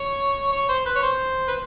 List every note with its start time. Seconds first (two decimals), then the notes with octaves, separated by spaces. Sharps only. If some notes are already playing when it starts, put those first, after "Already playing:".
Already playing: C#5
0.52 C#5
0.68 C5
0.85 B4
0.95 C#5
1.03 C5
1.48 B4